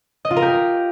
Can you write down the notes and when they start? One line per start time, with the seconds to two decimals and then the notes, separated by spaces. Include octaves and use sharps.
0.25 D#5
0.31 F4
0.36 A#4
0.42 G4